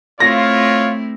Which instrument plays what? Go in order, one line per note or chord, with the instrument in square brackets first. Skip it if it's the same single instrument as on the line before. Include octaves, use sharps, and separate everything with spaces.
[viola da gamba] A3 C4 E4 [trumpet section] F4 [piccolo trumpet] C#5 [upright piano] A#6